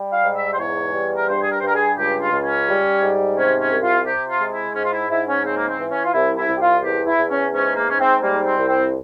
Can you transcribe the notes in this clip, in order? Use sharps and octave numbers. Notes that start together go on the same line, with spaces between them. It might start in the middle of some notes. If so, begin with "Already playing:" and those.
Already playing: G3
F5
G#2
E5
C5
E2 C#5
G3
A#4
G2 C5
G#4
A#4
C5
G2 A#4
G#4
C#2 G4
F4
C#2
C#4
G3
G#2
C3 C#4
C#4
C2
F4
C3 G4
F4
G#3
E4
G#2 C#4
F4
E4
G#2 E4
C#4
C#3 C4
A#3
C4
E3
C#4
F4
C2 E4
E4
C2
G4
F4
E2 G4
E4
E2
C#4
G#2 C#4
A#3
G#2 C#4
C4
G3 A#3
C4
C2
C4